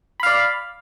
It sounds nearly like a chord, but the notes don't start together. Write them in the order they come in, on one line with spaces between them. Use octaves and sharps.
B5 F5 D5